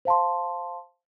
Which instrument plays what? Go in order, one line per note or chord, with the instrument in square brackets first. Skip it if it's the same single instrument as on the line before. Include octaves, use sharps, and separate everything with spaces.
[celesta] C5 F5 A5 C6